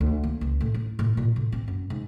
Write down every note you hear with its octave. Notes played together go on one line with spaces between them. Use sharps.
D2
A#3
C#2
A2
E4
A2
A#2
A2
C4
F#2
G#2